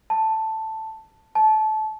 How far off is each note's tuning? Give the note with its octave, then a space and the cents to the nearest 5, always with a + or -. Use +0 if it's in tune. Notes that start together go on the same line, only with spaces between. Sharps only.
A5 +5
A5 -20